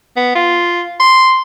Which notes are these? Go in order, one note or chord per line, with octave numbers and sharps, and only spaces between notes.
B3
F4
C6